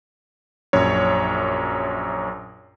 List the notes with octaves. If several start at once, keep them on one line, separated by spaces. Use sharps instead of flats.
A#1 F#2 C#5